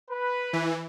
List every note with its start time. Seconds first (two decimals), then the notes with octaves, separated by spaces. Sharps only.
0.11 B4
0.53 E3